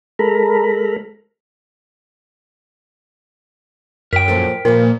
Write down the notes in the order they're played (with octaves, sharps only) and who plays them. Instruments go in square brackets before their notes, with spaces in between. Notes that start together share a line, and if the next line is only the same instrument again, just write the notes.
[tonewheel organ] G#3 A4 A#4 A#5 B5
[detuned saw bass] F#2 [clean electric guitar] A#4 G5 [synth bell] B6
[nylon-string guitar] A#2 F3 A4
[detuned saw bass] A#2 [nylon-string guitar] F3 B4 [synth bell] A#4